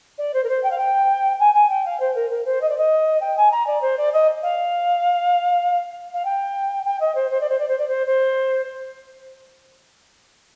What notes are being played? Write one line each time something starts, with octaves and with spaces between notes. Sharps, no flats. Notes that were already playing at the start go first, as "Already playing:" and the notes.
D5
C5
A#4
C5
G5
F5
G5
G#5
G#5
G5
F5
C5
A#4
A#4
C5
D#5
D5
D#5
G5
G#5
A#5
D5
C5
D5
D#5
F5
F5
G5
G5
D#5
C5
C5
D5
C5
D5
C5
D5
C5
C5